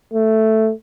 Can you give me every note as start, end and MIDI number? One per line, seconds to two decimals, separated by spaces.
0.14 0.72 57